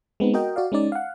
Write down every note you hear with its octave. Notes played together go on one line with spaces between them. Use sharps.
G#3 B3 C4 D#4
F#4 A#4 D#5 G5
F#4 D5 F5
G#3 C#4 D#4 D5
F5 F#5